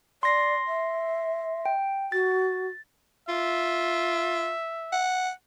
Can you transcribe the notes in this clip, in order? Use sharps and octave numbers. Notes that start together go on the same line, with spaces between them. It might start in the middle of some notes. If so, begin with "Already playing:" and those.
D5 C6 A#6 C7
E5
G5
F#4 A6
F4 E5
F#5